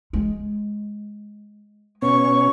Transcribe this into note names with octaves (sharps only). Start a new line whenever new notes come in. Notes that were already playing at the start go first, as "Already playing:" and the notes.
G#3
B2 C#4 C#6